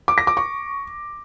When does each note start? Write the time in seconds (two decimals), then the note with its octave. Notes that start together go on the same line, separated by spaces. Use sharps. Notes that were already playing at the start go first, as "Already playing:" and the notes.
0.08 D6
0.18 A#6
0.27 D6
0.37 C#6